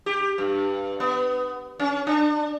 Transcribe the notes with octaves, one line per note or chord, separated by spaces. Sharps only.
G4
G2
B3
C#4
D4